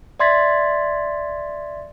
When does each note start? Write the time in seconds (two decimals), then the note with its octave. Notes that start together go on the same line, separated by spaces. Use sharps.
0.19 D5 E5 C6 G#6 A6 B6